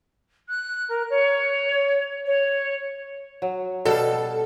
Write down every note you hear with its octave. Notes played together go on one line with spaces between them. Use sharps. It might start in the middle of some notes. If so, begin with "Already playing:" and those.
F#6
A#4
C#5
C#5
F#3
B2 G3 A4 F5